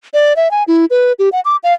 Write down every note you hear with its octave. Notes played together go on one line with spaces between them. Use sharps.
D5
E5
G#5
E4
B4
G4
F#5
D6
F5